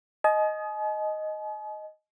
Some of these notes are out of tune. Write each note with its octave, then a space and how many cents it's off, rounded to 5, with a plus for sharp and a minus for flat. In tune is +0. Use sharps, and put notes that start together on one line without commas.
D#5 +0 G#5 +45